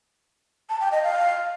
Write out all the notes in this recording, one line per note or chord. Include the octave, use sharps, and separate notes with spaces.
A5
G5
D#5
F5